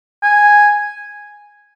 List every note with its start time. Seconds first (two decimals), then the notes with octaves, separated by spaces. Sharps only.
0.23 G#5